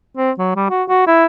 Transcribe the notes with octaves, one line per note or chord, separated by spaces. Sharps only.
C4
F#3
G3
F#4
F#4
E4